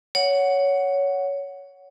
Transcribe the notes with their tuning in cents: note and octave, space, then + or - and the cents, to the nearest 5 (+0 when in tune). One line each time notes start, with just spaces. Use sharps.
C#5 +15 F#5 +0